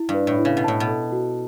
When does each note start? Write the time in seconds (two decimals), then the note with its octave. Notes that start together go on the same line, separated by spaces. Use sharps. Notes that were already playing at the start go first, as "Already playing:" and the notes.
Already playing: E4
0.09 G2
0.14 B4
0.27 A2
0.39 E4
0.45 C#3
0.57 B2
0.64 A2 A5
0.80 B2
0.88 A4
1.12 F#4